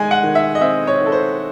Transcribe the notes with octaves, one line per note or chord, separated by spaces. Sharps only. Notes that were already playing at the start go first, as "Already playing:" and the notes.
Already playing: D#3 G#3 G#5
F#5
D#3
E5
D#5
C4 E5
C#5
D#3
A4
C5